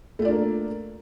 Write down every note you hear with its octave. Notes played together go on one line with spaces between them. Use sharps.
A3 A#3 D4 F4 D5